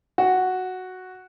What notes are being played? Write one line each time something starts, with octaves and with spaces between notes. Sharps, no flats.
F#4